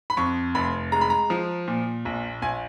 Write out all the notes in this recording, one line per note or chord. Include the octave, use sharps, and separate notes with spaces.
B5
F2 C#6
F1 B5
G#3 A#5
B5
A#5
F3
A#2
A#1
A#1 G#5